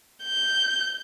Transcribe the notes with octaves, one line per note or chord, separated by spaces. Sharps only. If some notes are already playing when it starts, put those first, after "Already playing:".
G6